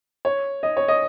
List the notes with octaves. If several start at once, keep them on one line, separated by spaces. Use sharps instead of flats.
C#5
D#5
C#5
D#5